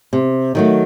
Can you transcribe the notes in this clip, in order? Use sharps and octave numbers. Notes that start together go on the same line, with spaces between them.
C3
D#3 F#3 A3